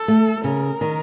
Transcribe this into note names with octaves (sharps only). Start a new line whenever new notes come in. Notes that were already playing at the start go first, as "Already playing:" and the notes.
Already playing: A4
A3
C#3 A#4
D#3